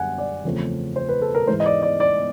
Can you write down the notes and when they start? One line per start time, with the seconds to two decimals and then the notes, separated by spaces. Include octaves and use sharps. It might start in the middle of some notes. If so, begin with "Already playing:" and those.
Already playing: F#2 D3 G3 F#5 G#5
0.18 D5
0.44 E2 C#3 F3 A3 C4
0.96 C5
1.09 B4
1.22 A4
1.35 A#4
1.47 G#2 E3 G#3 C5
1.60 D#5
1.66 D5
1.82 D5
2.00 D5